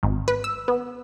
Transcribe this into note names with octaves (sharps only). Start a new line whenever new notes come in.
G#1
B4
E6
B3